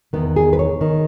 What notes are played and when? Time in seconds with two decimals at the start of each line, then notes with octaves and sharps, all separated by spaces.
0.13 E2 D#3 B3
0.36 G#4
0.53 B4
0.59 C#5
0.81 D#3